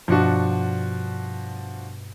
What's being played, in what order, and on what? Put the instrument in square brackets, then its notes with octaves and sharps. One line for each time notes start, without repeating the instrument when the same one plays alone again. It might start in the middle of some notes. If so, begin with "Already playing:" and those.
[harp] G2 B2 C#7 [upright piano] F3 D4 F#4